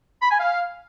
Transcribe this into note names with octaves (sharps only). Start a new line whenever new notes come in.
B5
G#5
F5